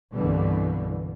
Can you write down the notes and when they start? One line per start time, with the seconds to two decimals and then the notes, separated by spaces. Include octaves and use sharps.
0.12 C2 G2 B2 D3 E3 G3